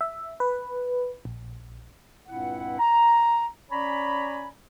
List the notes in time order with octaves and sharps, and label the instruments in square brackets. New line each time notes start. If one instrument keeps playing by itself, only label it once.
[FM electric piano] E5
B4
A#1
[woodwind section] C#2 G2 A#2 C4 E4 F#5
A#5
C#4 C#5 D5 G#5 A#5 B5